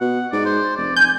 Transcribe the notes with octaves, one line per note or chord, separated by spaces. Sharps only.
B2 F#5
G#2 D5
C5
F1 D5
G#5 G6